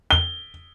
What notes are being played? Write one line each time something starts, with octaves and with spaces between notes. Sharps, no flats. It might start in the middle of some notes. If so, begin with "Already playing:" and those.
G7